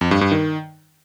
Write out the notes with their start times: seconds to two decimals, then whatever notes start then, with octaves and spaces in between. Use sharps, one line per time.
0.01 F2
0.11 G2
0.21 G2
0.31 D#3